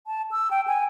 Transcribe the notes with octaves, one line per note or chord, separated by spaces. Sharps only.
A5
E6
G5
G#5